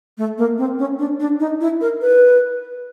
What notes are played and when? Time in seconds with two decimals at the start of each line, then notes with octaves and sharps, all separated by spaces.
0.18 A3
0.38 A#3
0.58 C4
0.79 C#4
0.99 D4
1.20 D4
1.40 D#4
1.61 E4
1.81 A#4
2.02 B4